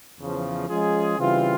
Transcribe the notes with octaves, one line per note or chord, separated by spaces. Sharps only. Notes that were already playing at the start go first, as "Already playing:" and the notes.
E2 C#3 F3
F3 G#3 C#4 F4 G#4
C#3 E3 G3 C4 F4